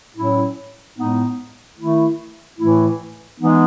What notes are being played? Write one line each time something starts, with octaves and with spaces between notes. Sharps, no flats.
A2 F#3 C#4 E4
A2 G#3 B3 D#4
D#3 A3 E4
A2 E3 A3 E4
E3 G#3 B3 D#4